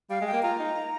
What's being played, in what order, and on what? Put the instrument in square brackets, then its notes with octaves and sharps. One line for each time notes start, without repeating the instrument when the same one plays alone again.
[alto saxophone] G3 [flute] F5
[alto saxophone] G#3
[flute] G5
[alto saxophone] A#3
[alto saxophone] F4 [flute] A#5
[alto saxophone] D#4